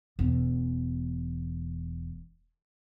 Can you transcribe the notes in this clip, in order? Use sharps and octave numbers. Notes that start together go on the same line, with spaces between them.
E1 E2